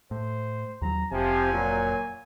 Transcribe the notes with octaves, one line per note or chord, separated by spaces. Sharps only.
A2 C5
D#2 F3 F#3 A#5
F1 C3 F3 G#5
A#2 F#3